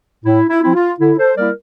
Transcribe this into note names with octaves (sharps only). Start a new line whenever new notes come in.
A2 E4
E4
F3 C4 E4
F4
D3 E4
A4 C5
G3 A#3 E4 A#4 D5